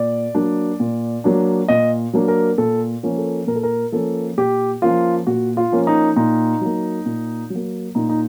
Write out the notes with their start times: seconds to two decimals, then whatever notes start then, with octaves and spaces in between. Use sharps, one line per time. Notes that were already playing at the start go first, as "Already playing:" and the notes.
Already playing: A#2 D5
0.35 F#3 A#3 D4
0.80 A#2
1.24 F#3 A#3 D4
1.68 A#2 D#5
2.13 F#3 A#3 D4
2.28 A#4
2.58 A#2 A4
3.03 F3 A#3 C#4
3.18 A4
3.47 A#2 A#4
3.56 A4
3.63 A#4
3.92 F3 A#3 C#4 A4
4.37 A#2 G4
4.82 F3 A#3 C#4 F4
5.27 A#2 F#4
5.57 F4
5.72 F3 A#3 C#4
5.87 D#4
6.16 A#2 D#4
6.61 F#3 A#3
7.06 A#2
7.50 F#3 A#3
7.95 A#2 D#4
8.09 D#4